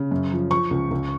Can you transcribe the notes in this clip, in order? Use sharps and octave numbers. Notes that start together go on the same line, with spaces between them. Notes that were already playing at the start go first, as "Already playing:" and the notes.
Already playing: C#3
F#2
F3
F3 C#6
C#2
C#2